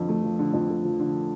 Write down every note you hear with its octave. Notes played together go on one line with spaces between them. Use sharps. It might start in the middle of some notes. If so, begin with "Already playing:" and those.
Already playing: F2 D3 F3
A3
F3
D3
F2
A3
F3
D3